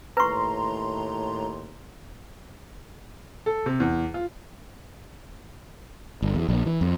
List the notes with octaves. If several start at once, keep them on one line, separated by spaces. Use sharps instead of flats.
D#2 A2 B4 A#5 C6 C#6
A4
C3
E2
F4
G1
E2
A#1
E3
F2